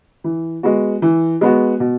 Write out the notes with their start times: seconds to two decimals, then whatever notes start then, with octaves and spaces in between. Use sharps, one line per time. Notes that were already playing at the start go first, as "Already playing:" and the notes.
0.24 E3
0.63 G#3 B3 F#4
1.02 E3
1.41 G#3 B3 F#4
1.80 B2